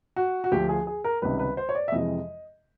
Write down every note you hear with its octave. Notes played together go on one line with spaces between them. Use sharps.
F#4
F#4
D2 D3 F3 G4
G#4
G#4
A#4
C#2 C3 D#3 G3 B4
B4
C5
C#5
D5
E5
F2 C3 E3 G#3 D#5